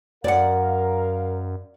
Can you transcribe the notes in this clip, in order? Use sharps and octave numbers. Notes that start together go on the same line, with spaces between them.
F#2 A#4 D5 F5 F#5